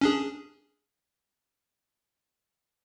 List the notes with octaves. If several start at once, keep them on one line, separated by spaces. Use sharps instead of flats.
C#4 D4 G#4